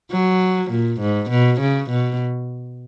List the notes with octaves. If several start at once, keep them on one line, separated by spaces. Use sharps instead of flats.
F#3
A#2
G#2
B2
C#3
B2